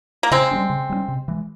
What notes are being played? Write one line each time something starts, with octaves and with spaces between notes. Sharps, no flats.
A#3
C#3 G#3 C4
G3 A#3 C#4
C#3
G3 A#3 C#4
C3
E3 G#3